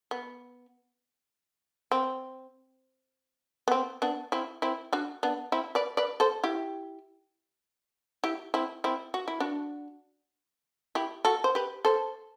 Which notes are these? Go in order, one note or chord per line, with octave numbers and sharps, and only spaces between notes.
B3
C4
B3
C4
B3 D4
C4 E4
C4 E4
D4 F#4
B3 D4
C4 E4
B4 D5
B4 D5
A4 C5
E4 G4
E4 G4
C4 E4
C4 E4
F#4
E4
D4 F#4
E4 G4
F#4 A4
C5
G4 B4
A4 C5